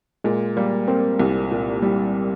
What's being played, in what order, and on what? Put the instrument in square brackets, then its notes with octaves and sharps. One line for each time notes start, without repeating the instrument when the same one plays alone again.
[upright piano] A#2 [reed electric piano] G#3
[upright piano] G3 [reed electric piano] A#3
[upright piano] A#3 [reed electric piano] C4
[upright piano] C2
A#2
G3